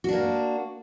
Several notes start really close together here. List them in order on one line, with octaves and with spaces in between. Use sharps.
F#4 D4 A#3